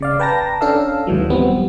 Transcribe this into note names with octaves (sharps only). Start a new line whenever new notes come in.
C#3 D5 F5
B4 G5 A5 A#5 A#6
C#4 D4 A4 F5 E6
D#2 G#2 E3 F#3
F3 G3 B3 C4